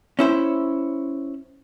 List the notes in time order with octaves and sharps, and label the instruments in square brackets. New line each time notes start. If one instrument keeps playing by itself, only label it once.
[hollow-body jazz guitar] C#4 E4 C5